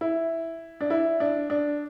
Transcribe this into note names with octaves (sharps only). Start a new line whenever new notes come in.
E4
D4
E4
D4
D4